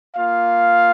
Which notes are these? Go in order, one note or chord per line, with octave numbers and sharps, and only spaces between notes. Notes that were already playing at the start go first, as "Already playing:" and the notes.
A#3 F4 F5